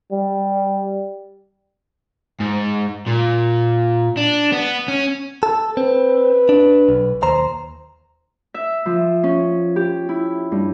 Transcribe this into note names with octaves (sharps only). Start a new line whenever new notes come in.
G3
G#2
A#2
D4
B3
C#4
A4
C4 B4
D4
B1
D#2 C5 A#5
E5
F3
C#4
G4
E4
G2